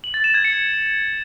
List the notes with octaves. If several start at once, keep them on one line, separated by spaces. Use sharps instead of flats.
F#7
A6
E7
G#6
C#7